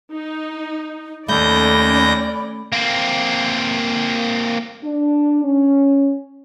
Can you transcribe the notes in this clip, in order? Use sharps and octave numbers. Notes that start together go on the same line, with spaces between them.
D#4
D#2 A3 C#4 D5 B5 G6 A#6
A#3 C4
D4
C#4